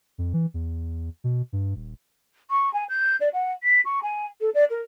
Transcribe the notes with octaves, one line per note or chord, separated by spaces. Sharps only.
F2
E3
E2
B2
G2
D#1
C#6
G#5
G6
D5
F#5
B6
C#6
G#5
A4
D5
A#4